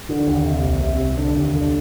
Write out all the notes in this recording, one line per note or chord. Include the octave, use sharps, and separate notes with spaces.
D3
D#2
C3
C2
C3
C2
D3
D#2
D3